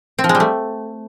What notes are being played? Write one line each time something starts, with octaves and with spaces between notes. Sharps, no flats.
C4
F3
G#3
G3
A3